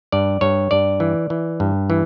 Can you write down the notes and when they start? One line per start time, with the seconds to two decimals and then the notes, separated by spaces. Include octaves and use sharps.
0.12 G2 D5
0.41 G2 C#5
0.71 G2 D5
1.00 E3
1.30 E3
1.60 G2
1.90 E3